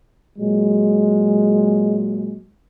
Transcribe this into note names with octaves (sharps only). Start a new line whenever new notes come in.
A#2 F#3 G#3